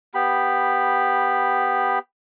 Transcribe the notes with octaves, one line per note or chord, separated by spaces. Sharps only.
B3 G4 B5